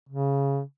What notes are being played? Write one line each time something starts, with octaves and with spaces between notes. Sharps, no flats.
C#3